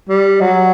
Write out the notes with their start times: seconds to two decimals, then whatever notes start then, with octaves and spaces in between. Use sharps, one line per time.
0.09 G3
0.41 F#3